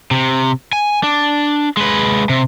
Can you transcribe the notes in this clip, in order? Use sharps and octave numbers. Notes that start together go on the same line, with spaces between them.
C3
G#5
D4
G#3 B4
C3